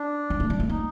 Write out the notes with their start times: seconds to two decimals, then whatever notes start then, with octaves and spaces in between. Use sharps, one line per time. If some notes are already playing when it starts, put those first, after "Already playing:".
Already playing: D4
0.30 G3
0.40 A3
0.50 G3
0.60 A3
0.69 A#3 D#4